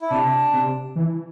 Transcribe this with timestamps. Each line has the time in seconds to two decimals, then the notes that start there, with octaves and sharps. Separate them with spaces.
0.02 E4
0.10 C3 D4
0.53 C3
0.96 E3